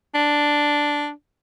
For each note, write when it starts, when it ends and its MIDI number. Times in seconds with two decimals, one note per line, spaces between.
0.15 1.10 62